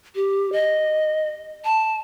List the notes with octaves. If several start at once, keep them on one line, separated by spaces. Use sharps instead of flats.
G4
D#5
A5